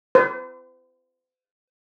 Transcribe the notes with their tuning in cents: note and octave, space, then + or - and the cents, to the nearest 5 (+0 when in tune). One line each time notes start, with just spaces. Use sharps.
C5 -40